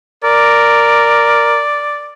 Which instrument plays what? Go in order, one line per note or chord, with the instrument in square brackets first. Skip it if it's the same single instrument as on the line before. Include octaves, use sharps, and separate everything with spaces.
[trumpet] A#4 [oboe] D5